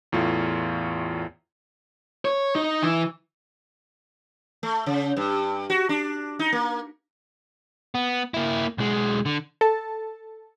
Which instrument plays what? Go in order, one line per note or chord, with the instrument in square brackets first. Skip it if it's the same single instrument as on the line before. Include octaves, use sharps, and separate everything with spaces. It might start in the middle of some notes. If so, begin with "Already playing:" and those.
[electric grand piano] E2 A2 F4
[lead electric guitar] C#5
D#4
E3
[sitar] A3
C#3
G2
F#4
D4
D#4
A#3
[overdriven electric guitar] B3
A#3 E4
B1 G#3
D3
[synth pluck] A4 A5